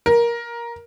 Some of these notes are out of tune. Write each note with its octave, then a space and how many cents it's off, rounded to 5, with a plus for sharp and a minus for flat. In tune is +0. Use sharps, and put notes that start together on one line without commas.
A#4 +10